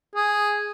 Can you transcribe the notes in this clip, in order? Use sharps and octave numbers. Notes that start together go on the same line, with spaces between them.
G#4